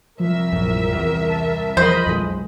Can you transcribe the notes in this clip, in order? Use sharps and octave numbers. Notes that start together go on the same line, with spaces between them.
C2 F3 A#4 E5
A#1 F#2
E2
A5
E2 F3 A#4 C5 D#5 B5
B1 F2 E3 G#3